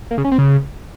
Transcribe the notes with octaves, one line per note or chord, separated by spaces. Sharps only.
A#3
C#3
C#4
C4
C#3